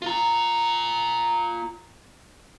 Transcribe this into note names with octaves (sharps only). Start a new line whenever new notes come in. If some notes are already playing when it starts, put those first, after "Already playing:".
F4 A#5